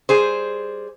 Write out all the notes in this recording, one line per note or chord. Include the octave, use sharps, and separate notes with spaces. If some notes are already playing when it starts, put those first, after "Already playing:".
G3 G#4 C5